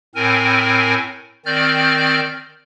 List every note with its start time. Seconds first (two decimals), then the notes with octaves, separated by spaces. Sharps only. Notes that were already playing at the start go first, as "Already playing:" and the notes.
0.15 A2 C4 A#4 G#5
1.46 D#3 C4 D5 F6 G6